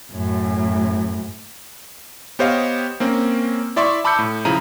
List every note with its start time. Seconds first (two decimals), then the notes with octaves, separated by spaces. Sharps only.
0.12 F#2 A2
2.39 B3 G4 C5 C#5 D#5 F5
3.00 A#3 C4 C#4
3.76 E4 D5 E5 C6 C#6
4.05 A5 B5 D6 E6 G6 C#7
4.19 A2
4.45 C#3 F3 E4 A#5 D#7